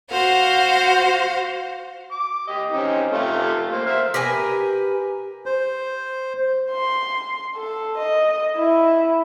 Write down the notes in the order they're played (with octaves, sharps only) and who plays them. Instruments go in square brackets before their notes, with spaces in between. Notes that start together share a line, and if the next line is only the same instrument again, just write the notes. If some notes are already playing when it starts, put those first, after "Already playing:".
[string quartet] F#4 C5 F5 F#5
[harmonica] D6
G4 D#5
C4 C#4 D#4
A3 F4 G4
A#3 C5 F5
C5 E5 F6
[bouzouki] G4 A#4 B4 G#5
[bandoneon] C5
[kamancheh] C6
A4
D#5
E4